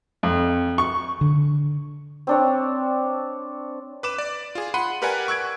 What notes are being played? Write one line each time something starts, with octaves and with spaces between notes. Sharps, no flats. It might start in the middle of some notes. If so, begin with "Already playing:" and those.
F2
C#6
D3
C4 D4 C#5
B4 D6 E7
D5
F4 G#4
F#5 B5 C6 D#7
G4 A#4 B4 D5 F#5 G#5
C#6 E6 F#6 G#6 D7